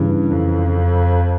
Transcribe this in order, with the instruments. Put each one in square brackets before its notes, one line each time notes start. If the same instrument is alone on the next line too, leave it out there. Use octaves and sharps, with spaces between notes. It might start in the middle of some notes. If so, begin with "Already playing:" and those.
Already playing: [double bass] G2 [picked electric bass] C#3 E3
[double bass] F2